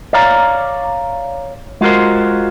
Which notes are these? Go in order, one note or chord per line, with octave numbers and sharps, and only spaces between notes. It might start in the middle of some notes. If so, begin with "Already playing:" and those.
C#5 D5 F5 A#5
G#3 F4 F#4 A#4 C5